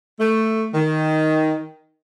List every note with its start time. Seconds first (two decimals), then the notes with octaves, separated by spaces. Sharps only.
0.19 A3
0.74 D#3